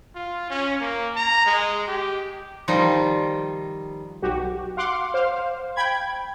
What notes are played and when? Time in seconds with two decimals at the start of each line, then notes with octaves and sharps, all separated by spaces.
0.15 F4
0.50 C#4
0.80 A#3
1.16 A#5
1.46 G#3
1.87 G4
2.68 D#3 F3 G3 D#4 F4
4.22 B1 F#4 G4
4.77 F5 F#5 C6 D6
5.14 C5 F5
5.76 G5 B5 G#6